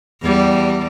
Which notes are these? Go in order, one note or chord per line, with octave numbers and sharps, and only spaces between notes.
E2 G3